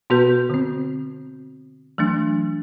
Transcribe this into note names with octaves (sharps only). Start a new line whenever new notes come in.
B2 B3 F#4 B4 G6
D3 C4
E3 F#3 A3 D4